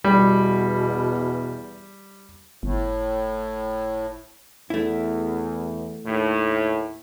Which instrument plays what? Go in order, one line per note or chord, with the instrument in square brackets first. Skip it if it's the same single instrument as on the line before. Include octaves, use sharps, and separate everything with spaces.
[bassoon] E2 [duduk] B2 [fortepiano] G3
[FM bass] G1 [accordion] A2
[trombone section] E2 [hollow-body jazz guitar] A3 E4
[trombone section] D#2 A2